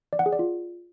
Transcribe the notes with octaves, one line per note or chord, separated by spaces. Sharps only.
D5
F#5
G#4
D5
F4